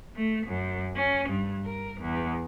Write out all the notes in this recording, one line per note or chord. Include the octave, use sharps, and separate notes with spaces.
A3
F#2
C#4
G2
A#4
E2